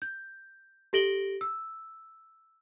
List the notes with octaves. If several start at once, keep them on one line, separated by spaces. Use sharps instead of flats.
G6
G4 A4 A#6 D7 F#7 G7
E6